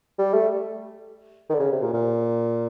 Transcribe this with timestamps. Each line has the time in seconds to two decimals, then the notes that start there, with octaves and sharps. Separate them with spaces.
0.19 G3
0.33 A3
1.50 D#3
1.54 D3
1.60 C#3
1.72 C3
1.82 A#2
1.93 A#2